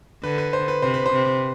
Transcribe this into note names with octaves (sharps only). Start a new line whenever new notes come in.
D3 B4
B4
C5
B4
C3 C5
B4
C5
C3